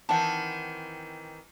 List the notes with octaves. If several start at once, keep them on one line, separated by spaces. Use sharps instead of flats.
D#3 E3 C4 F#5 A5